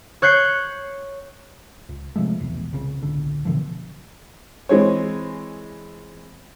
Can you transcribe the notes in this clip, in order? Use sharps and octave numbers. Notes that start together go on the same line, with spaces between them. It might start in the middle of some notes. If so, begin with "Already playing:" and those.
C#5 F#6 G6 C7 C#7
C#2
C3 F3 G#3 A3
F1 B1 E2
C2 C#3
D1 B1 D3
B2 D3 E3 F3
E3 G#3 C4 C#5